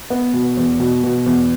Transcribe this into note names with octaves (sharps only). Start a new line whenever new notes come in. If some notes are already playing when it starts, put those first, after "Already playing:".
B3
B2
E2
B2
B2
E2